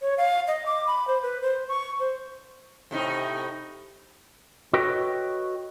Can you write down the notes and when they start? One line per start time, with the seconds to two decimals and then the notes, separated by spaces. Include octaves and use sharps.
0.02 C#5
0.18 F5
0.48 D#5
0.66 D6
0.87 B5
1.07 C5
1.23 B4
1.42 C5
1.68 C#6
2.00 C5
2.91 A2 C3 D#4
4.73 F#4 A4 B4 C#5 D#5 G5